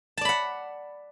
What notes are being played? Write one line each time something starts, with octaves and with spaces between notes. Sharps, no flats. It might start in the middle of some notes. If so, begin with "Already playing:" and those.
D5 F#5 A5 B5